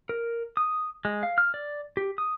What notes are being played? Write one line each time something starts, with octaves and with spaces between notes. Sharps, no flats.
A#4
D#6
G#3
F5
F6
D5
G4
D#6